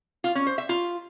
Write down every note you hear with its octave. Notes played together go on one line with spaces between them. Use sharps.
F4
C#4
C5
E5
F4